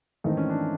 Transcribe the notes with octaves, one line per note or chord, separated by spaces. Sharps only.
G#2 D#3 E3 A3 C4 D#4
C#4
D4